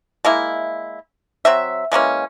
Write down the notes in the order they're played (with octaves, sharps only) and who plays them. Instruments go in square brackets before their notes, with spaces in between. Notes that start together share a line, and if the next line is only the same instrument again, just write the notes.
[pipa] G#3 A#3 E4
F#3 C4 E5
E3 G#3 A#3 C#4